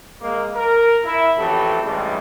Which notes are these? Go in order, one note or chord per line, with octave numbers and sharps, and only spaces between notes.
G#3 A#3
A#4
E4
A1 F2 E3 F#3 G4 A4
A1 G2 G#3